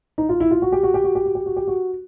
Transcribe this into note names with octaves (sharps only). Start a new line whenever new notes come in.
D#4
F4
E4
F4
F#4
G4
F#4
G4
F#4
G4
F#4
G4
F#4
G4
F#4